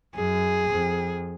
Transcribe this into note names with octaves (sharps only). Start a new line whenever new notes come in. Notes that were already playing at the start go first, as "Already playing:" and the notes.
F#2 G#4
F2